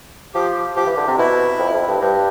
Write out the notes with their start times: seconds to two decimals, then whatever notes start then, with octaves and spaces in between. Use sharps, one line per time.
0.34 F3 G4
0.76 F3 G4
0.87 E3
0.97 D3
1.08 C3
1.17 B2 E4
1.59 F2
1.73 F2
1.88 G2
2.01 G2